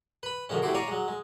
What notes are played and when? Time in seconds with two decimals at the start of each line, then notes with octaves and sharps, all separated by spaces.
0.23 B4 B5
0.49 F#2 D3 F3 G#3 C#4
0.62 C3 A3 E4 F#4 C6 D6
0.74 C#5 D5 F5 G#5 A#5 D6
0.88 F#3 G#3
1.08 G#3